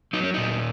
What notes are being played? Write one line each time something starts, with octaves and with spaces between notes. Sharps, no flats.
F#3 D#4
C#4
A#2 D#4